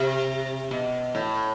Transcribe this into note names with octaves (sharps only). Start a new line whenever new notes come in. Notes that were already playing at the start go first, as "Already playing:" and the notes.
Already playing: C3
B2
A2